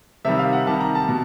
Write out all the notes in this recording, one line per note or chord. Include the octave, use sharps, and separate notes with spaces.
C3 D#3 G3 E5
F5
F#5
C3 D#3 G3 A5
A#5
A5
B2